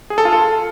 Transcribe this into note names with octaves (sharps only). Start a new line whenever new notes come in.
G#4
A4
F4
A4